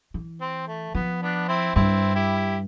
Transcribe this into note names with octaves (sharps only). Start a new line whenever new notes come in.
E3
C4
A3
F3 B3
B3 D4
C4 E4
G2 C4 E4
E4 G4